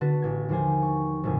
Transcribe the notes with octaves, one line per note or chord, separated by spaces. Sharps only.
D3 B3 F#4 A4 B4
A1 G#6
D#2 F3 C5 G#5
C#6
G#1 F2 A2 C#3 G#5 D#6